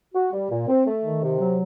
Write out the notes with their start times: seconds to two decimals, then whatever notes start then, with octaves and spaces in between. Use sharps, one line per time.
0.15 F#4
0.33 G3
0.51 A#2
0.68 C4
0.86 A3
1.04 D#3
1.22 C3
1.40 F#3